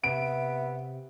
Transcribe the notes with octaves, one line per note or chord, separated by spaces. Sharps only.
C3 B3 E5 D7